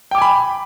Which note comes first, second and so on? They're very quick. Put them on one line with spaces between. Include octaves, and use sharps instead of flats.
G5 D6 G#5 B5